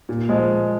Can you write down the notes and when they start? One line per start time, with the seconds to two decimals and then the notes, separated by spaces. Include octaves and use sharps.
0.09 A#2
0.29 F3 G#3